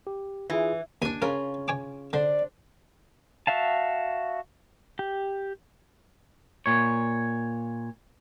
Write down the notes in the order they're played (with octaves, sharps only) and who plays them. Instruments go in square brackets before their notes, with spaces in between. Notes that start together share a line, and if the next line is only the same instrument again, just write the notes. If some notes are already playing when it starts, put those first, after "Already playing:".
[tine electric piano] G4
[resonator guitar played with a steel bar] E3 [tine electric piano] E4 F4 G#4
[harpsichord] D#2 [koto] D4 G#5
[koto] C#3 C#4 F4 [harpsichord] A#4
[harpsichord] C#5 G#5 D6
[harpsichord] D3 [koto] D4 C5 [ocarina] D5
[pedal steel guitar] F#4 E5 F5 A5
G4
[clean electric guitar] A#2 C#5